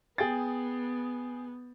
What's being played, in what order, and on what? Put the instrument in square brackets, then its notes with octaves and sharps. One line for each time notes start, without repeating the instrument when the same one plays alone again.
[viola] B3 [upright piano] G#4 G5 A6